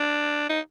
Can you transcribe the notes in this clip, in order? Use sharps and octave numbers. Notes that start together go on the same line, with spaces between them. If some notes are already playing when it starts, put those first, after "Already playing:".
Already playing: D4
D#4